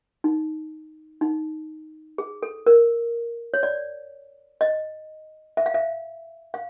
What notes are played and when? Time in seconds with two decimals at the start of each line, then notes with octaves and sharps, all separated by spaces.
0.24 D#4
1.21 D#4
2.18 G#4
2.43 A4
2.66 A#4
3.54 C#5
3.63 D5
4.61 D#5
5.57 E5
5.66 F5
5.74 E5
6.54 F5